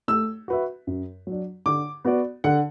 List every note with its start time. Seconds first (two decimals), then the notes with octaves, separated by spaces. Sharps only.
0.08 A3 E6
0.48 F#4 B4 E5
0.87 F#2
1.27 F#3 D4
1.66 D3 D6
2.05 B3 F#4 D5
2.44 D3 F#5